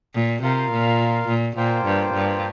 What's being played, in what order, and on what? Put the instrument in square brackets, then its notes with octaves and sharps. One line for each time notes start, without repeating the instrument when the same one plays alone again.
[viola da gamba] A#2
[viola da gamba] C3 [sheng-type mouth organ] F4 A#4 F5
[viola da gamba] A#2
A#2
[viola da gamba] A#2 [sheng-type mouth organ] A#3 F4 C5 G5
[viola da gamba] G2
G2